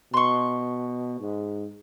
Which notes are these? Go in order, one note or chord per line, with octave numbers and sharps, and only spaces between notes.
B2 C6 C#6
G#2